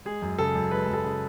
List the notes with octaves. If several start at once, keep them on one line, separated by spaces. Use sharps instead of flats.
G#3 G#4
F#2
C#3 A4
F#2
G#3 B4
F#2 A4
C#3